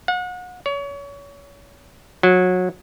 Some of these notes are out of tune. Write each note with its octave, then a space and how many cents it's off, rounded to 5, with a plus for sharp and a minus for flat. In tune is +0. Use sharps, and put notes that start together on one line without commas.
F#5 -35
C#5 +30
F#3 -25